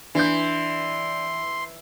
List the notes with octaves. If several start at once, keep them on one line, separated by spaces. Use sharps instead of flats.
E3 D4 C6 G6